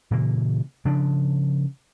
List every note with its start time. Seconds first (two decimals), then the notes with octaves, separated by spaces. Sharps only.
0.11 A#2 C#3 E3 A#3
0.85 C#3 F3 D4